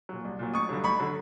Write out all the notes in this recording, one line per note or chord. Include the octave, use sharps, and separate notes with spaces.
A#2 F#3
C2
A#2 F#3
A1 C#6 D#6
G2 D3 F#3
A1 B5 C#6
D3 F#3